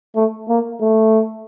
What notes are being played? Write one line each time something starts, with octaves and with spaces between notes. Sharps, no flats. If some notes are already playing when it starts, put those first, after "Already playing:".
A3
A#3
A3